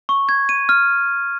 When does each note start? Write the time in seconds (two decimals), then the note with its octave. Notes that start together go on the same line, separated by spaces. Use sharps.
0.09 C#6
0.29 G#6
0.49 D#7
0.69 F6